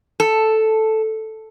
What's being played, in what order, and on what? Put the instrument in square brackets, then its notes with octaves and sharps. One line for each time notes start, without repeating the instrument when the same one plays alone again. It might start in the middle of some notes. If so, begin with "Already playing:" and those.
[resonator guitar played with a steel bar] A4